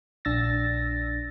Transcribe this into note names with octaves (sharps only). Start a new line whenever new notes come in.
A#1 D4 E6 A6 A#6